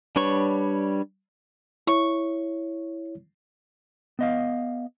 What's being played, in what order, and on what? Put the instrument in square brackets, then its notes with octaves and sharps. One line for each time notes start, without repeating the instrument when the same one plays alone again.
[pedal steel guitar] G3 D4 B4 C#5 C#6
[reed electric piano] E4 C#5 [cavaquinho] C#6
[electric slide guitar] B3 D#5 F5